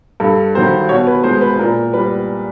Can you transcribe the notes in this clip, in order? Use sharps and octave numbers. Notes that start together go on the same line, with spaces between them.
G2 A4
D#3 F#3 C5
B2 C#5
B4
G#3 C5
B4
A#2 A#4
G3 B4